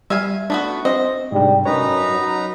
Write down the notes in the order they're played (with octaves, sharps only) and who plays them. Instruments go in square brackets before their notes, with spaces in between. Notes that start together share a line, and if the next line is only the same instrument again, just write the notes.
[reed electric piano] G3 [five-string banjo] E5 F5 G#5
[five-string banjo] A3 B3 F#4 [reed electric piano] D4
[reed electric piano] C4 C5 [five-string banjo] D#5
[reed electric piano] G#2 C3 D4 [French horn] G3
[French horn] F#2 [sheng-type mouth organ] D#4 B4 A#5 [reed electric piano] C#5
[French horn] F#3